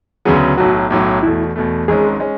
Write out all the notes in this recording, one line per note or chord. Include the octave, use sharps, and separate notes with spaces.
D2 C#3 F#3 B3 G#4
B1 A2 F#3 F#4
B1 A2 F#3
E2 B2 A3 E4
E2 B2 A3
G#1 G#2 G#3 C#4 G#4
G#3 C#4